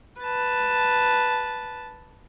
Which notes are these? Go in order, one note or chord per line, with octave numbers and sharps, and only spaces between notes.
B4 A5